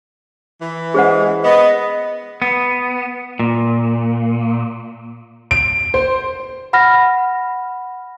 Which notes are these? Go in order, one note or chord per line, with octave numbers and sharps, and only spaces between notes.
E3
G#3 G#4 C5 F#5
B3 D#5
B3
A#2
D7
C5
F#5 B5 F6 A#6